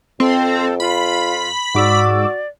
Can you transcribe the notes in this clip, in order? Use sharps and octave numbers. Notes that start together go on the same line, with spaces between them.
F2 C4 A4
F4 B5
G#2 F#4 D5 D6 E6